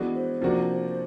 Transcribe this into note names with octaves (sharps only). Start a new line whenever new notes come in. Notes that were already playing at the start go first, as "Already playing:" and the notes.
Already playing: E3 G#3 B3 D4 F#4
C5
C3 F3 A#3 D4 F#4